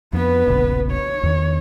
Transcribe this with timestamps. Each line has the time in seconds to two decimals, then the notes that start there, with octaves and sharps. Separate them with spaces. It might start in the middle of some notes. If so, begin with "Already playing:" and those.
0.13 F2 B3 B4
0.48 E1 A#1 C#3
0.91 C#5
1.23 E2 D#3